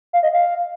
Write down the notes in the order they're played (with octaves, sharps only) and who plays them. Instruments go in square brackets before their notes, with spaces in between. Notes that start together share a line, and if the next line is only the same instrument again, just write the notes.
[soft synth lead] F5
D#5
F5